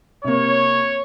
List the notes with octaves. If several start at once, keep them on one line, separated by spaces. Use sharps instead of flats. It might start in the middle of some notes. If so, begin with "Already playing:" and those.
C3 A#3 C#5